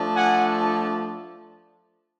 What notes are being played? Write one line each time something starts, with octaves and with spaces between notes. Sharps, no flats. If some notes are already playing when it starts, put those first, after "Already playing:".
Already playing: F3 A3 D4
F#5 G#5